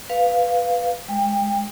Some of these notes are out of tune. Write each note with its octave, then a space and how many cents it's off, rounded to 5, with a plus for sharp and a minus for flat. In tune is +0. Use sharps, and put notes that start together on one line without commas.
B4 +0 F5 +0
G#3 +0 G5 +25